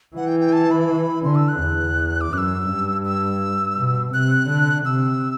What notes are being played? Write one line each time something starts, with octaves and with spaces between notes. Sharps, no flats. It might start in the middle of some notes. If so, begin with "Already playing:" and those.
E3 F#5
G5
G5
A5
B5
D3 C6
E6
F#6
E2
D6
F#2 F#6
E6
G2
E6
B2
C3 F#6
D3
C3 E6